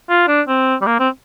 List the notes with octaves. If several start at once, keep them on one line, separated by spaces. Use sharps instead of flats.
F4
D4
C4
G3
A#3
C4